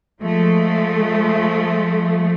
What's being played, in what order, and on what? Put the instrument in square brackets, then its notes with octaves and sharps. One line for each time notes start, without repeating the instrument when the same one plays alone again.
[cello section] F3 G#3 A3